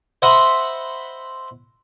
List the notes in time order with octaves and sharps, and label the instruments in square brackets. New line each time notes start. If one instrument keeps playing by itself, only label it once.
[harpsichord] C5 D#5 E5 F#5 B5 C6